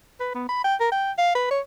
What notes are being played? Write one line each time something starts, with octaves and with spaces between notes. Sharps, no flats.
B4
B3
B5
G5
A#4
G5
F5
B4
C#5